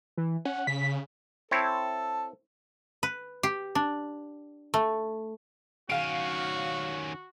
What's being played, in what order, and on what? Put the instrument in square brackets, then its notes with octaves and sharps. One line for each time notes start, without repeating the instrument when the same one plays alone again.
[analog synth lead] E3
[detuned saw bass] C#4 [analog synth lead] F#5
[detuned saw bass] C#3 [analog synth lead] B6
[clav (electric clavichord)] C4 E4 C#5 [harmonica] A4
[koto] B4
G4
D4
A3
[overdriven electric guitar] D#3 C#4 [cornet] F#4 [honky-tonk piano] F5 D7